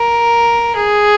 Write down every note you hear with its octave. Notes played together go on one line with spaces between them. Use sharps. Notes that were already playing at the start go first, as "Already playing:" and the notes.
Already playing: A#4
G#4